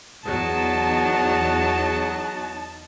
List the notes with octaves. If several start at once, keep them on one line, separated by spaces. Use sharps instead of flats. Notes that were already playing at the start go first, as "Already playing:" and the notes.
E2 F#3 D#4 G#4 A5